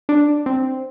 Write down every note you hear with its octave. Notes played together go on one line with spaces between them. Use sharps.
D4
C4